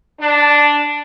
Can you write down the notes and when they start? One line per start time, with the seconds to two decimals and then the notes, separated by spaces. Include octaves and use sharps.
0.20 D4